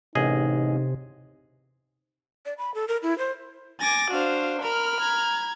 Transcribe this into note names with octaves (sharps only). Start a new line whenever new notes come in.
A1 C3 D#4 G#4 D#5
D5
B5
A4
A#4
E4
C5
G#5 D6 A6 A#6
D4 F#4 C5 F5
A#4 B5 F6
A#5 G#6